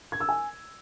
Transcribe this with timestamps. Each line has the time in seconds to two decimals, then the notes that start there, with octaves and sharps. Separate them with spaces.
0.12 G#6
0.20 E6
0.29 G#5